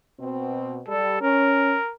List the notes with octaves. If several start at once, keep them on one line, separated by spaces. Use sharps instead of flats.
B2 C4
G3 A4
C#4 A#4